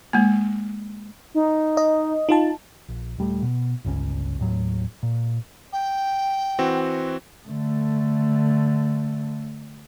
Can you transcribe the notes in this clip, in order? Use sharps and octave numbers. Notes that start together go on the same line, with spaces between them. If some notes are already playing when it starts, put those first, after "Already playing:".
G#3 A#3
D#4
D#5
D#4 F4 A5
A#1
D#1 G3 A3
B2
G1 C#2 C#4
D#2 A2 F#3
A#2
G5
E3 C4 F#4
D3 A3